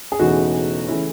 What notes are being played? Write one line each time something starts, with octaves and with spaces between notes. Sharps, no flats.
G#4
E1 E2 C#3 E3 A3 D#4 F#4
C#3 E3 A3 C#4 E4